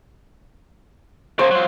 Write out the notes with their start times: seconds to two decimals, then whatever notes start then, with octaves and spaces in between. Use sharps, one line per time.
1.39 C#3 A#3 C5
1.51 F#3 F4